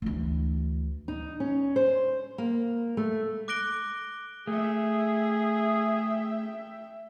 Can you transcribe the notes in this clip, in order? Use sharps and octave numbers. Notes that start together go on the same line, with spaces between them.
D2 E3
D#4
C#4
C5
A#3
A3
D6 F#6 A#6 D7 G7
A3 G#4 E5 G5